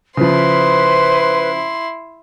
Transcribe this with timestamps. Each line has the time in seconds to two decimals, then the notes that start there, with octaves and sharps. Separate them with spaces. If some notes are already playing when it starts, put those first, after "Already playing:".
0.17 C#3 F3 E4 B4 C5 C6